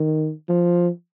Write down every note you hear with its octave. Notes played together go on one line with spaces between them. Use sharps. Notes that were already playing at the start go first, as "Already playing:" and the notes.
Already playing: D#3
F3